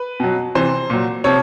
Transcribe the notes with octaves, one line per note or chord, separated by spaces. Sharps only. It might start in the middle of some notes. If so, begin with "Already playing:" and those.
Already playing: B4
B2 F#3
C3 E3 C5
A#2 F#3
C3 F3 C#5